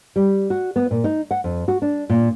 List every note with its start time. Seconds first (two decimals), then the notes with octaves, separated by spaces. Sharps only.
0.16 G3
0.50 F#4
0.76 B3
0.91 A#2
1.04 D#4
1.31 F#5
1.44 F2
1.68 F#4
1.82 D4
2.10 A#2